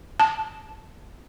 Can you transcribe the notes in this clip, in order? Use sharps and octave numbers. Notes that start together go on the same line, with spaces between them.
A5